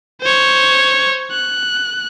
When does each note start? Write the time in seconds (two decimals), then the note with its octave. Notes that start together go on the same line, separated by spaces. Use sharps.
0.22 C5 C#5
1.32 F#6